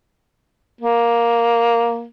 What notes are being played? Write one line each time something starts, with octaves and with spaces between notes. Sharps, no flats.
A#3